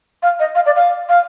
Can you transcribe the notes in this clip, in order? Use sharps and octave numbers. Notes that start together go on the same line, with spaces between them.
F5
D#5
F5
D5
F5
F5